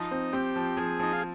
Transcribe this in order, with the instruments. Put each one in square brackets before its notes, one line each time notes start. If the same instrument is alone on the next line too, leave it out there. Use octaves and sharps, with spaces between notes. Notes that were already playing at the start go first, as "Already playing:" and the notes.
Already playing: [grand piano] F3 [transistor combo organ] D#4
[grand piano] C4
[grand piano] C4 [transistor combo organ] G4
[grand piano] F3
[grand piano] F3 [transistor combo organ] G#4
[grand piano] F3 [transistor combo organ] D#4
[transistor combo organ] F4